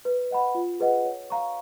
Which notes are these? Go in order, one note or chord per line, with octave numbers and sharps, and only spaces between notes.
B4
D#5 F#5 B5
F4
G#4 B4 D#5 F#5
C#5
F5 A#5 C#6